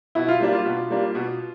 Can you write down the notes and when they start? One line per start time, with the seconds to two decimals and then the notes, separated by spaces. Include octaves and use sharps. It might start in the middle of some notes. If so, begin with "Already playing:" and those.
0.15 B2 E4
0.28 F4
0.40 G3 A#3 D4
0.53 F4
0.65 B2
0.90 G3 A#3 D4
1.15 B2